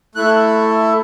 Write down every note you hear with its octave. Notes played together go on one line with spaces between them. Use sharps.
A3 E4 A4 F#6